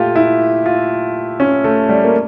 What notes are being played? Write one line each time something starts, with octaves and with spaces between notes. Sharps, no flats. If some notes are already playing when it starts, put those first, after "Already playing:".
Already playing: A#2 A3 F4 G4
E4
F4
C#4
A3
G3
A#3